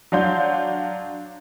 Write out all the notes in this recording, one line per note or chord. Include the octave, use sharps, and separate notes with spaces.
F#3 D4 F5 C6 G6